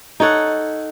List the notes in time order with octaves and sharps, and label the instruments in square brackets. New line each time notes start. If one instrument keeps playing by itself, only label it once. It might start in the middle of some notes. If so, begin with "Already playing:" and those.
[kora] D#4 A4 C#5 F#5